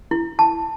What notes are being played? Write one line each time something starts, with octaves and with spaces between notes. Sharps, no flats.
E4
A5